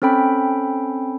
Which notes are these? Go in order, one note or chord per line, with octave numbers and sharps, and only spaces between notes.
C4 C#4 A4 G5 B5